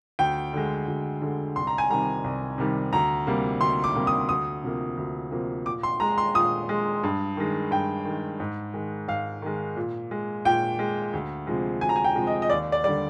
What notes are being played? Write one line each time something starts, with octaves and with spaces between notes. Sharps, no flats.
D2 G5
D3 G#3
D2
D3 G#3
C2 C6
A#5
G#5
C3 D#3 G3 A#5
C2
C3 D#3 G3
D2 A#5
C3 G3 A#3
D2 C6
D6
C3 G3 A#3
D#6
D2 D#6
C3 F3 A#3
D2
C3 F3 A#3
A#2 D6
C6
G#3 A#5
C6
A#2 D#6
G#3
G2
D#3 G#3
G2 G5
D#3 G#3
G#2
D#3 G#3
G#2 F5
D#3 G#3
A#2
G#3
A#2 G5
G#3
D2
C3 F3 G#3
D2 G#5
A#5
G#5
G5
C3 F3 G#3
D#5
D#5
D#2 D5
D5
D3 G3 D5